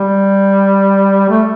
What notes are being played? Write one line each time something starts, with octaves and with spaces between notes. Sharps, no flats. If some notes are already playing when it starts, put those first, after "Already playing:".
Already playing: G3
A3